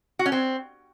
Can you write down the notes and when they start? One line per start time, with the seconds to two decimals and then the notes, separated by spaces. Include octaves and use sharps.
0.19 F#4
0.26 C#4
0.32 C4